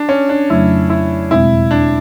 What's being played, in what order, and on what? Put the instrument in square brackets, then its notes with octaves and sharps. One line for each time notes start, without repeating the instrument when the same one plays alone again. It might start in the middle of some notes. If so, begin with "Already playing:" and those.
Already playing: [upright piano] D4
C#4
D4
[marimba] F2 C#3 F#3 A3 [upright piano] E4
[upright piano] E4
[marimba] E2 B2 G#3 C4 [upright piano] E4
[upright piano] D4